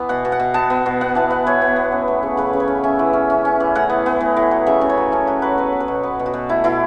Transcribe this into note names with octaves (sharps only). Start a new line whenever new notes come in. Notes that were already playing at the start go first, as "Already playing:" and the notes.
Already playing: E3 B3
B2 F#5
B2
F#5
B2
B3 A5
B3
B2
B3 F#5
E3 A5
B3 F#5
E3 C#5
B3
B3
C#4
A3
C#3
C#3 B4
C#3
C#5
C#4
C#4 E5
E3
C#4
C#4
C#4
E3
A2 F#5
B3
B3
A2
A2
F#3
C#3 E5
C#3
C#5
F#3
C#4 A4
F#3 F#4
F#3 B4
B3 B4
B3
B4
B2
B3
B2
F#4
B2
A3 E4
B2 E4